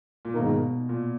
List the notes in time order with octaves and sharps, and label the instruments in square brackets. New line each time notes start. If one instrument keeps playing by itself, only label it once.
[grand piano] A#2
[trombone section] G#2 D#3 A#3 D#4 A#4 [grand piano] B2
[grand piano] A#2